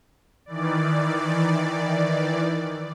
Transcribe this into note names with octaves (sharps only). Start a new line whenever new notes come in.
D#3 E3 D5